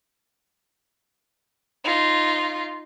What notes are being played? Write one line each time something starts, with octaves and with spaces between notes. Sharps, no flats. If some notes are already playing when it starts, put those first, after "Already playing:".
D#4 F4